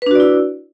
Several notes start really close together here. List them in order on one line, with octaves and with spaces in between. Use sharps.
B4 D4 F#4 D5 E4